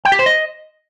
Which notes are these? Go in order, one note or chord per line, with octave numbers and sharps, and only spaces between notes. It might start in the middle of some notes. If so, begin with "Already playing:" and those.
G5
G4
C5
D#5